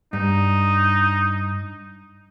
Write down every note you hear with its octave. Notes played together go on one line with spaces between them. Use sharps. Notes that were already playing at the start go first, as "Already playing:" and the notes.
G2 D#4